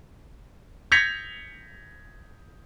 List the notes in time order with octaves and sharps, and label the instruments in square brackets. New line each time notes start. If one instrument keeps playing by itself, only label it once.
[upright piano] G6 G#6 A#6 B6 C#7 F7